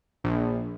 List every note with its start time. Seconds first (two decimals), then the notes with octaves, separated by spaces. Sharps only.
0.24 A#1